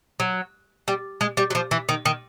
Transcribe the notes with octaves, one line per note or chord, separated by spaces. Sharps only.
F#3
G3
G#3
G3
F#3
F3
E3
D#3
D#3